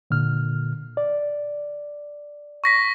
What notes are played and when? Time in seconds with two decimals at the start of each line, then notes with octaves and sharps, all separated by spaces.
0.11 A#2 D3 F6
0.97 D5
2.64 C#6 A#6 B6